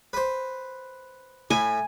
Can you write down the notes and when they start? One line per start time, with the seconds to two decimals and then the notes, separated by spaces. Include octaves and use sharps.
0.13 B4 C5
1.50 A2 E4 G#5